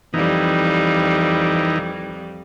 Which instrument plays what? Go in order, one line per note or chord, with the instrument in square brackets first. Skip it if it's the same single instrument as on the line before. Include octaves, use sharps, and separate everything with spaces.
[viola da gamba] F2 G3 [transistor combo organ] E3 D#4